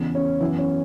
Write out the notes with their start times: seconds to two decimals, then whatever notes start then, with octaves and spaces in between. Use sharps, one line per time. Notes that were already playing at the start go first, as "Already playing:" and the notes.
Already playing: E2 C#3 E3 B3
0.15 C#4
0.40 F#2 E3 B3 E4
0.58 C#4